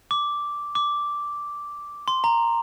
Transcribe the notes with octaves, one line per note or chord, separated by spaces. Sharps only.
D6
D6
C6
A#5